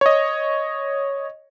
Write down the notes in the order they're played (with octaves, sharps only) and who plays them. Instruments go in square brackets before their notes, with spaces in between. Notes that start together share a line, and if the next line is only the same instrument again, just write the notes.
[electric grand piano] C#5 D#5